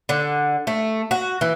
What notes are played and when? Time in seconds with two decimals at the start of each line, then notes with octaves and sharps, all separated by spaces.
0.09 D3
0.67 A3
1.11 F#4
1.41 E3